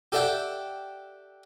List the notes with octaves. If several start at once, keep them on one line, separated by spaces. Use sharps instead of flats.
G4 A4 D5 E5 F#5 G5